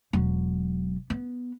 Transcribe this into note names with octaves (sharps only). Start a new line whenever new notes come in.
E1 F#3
B3